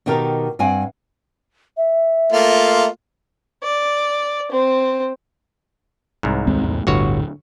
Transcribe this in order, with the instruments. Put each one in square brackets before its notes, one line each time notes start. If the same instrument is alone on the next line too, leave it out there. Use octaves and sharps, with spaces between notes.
[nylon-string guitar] B2 D#3 G4 A4 A#4
G2 C4 F#5 G#5
[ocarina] E5
[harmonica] A3 A#3 F4
[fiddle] D5
C4
[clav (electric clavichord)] C2 G#2
[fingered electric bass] D#2 G#3 C4
E2 A2
[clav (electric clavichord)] G1 F#4 C#5 [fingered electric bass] D2 A2 D3